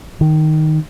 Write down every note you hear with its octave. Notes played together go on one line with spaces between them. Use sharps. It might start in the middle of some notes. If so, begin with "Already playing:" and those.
D#3